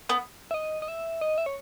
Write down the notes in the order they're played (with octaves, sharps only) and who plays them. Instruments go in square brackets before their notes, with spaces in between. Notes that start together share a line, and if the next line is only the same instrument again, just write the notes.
[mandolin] B3
[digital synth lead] E5
D#5
D#5
E5
D#5
E5
C#5